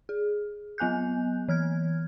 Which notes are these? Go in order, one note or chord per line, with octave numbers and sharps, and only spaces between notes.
G#4
F#3 B3 G#5 F#6 G6
E3 F6 G#6